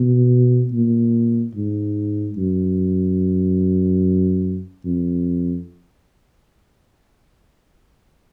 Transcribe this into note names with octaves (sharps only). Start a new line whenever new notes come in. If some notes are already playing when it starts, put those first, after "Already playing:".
Already playing: B2
A#2
G#2
F#2
F2